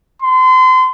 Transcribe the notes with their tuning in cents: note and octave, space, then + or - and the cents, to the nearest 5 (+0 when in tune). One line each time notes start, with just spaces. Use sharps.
C6 -30